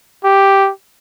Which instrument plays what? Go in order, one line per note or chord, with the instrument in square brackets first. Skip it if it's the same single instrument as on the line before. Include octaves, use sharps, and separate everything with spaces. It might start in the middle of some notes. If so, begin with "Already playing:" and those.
[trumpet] G4